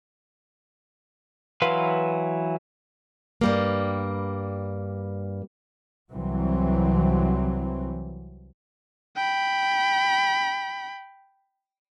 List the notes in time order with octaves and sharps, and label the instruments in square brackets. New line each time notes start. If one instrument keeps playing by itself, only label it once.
[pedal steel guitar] E3 F#3 B4 F5 C6
[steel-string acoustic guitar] G2 G3 A#3
[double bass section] C2 E3 F#3 C4
[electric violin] G5 B5